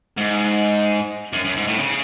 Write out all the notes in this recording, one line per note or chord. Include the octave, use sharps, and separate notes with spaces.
G#2
F#2
F#2
G#2
A2
C#3